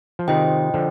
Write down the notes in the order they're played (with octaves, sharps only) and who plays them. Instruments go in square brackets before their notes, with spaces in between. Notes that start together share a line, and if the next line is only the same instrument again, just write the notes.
[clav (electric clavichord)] F3
[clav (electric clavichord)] C3 D#3 [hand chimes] F4 C5 D#5 G5
[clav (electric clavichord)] D3 F3